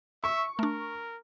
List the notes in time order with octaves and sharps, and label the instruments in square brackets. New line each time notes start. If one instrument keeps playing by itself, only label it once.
[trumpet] E5 [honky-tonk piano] C#6
[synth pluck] A3 D4 [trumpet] A#4